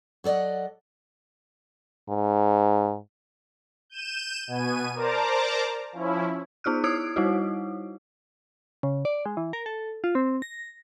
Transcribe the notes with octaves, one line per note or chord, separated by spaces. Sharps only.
F#3 A4 D5 D#5 F#5
G#2
G6 D#7 E7
B2 B3 G#5 D#7
A#4 C5 D5 A5 A#5 D6
F3 C#4 E4
B3 D#4 F4 F6 F#6
E4 D#6 E6 G#6 D7
G3 D#4 E4 F#4
C#3
D5
G#3
E3
A#4
A4
F4
C4
A#6